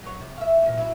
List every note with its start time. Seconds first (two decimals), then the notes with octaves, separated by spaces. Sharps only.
0.03 F#3 C#5
0.20 C3
0.38 E5 F5
0.62 E2 A#2
0.77 F#3 E4